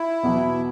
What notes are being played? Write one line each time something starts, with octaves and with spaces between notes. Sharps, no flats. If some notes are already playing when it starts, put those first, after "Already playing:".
Already playing: E4
E2 B2 F#3 B3